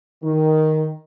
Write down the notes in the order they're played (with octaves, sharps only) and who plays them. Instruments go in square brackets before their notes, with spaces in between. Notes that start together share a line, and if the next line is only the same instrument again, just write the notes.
[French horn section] D#3